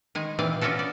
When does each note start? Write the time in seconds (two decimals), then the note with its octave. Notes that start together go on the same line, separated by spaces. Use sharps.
0.15 D#3 G#3 G#5
0.39 A#2 E3 C4 D5 F5
0.61 B3 C#4 D4 F4 F#4 A4
0.79 D5